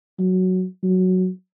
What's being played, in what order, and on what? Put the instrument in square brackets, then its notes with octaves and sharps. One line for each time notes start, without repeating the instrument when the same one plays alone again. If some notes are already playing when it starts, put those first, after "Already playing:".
[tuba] F#3
F#3